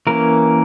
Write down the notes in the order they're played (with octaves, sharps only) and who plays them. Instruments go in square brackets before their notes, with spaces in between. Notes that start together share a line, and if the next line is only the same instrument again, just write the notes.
[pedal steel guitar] E3 A#3 C#4 A#4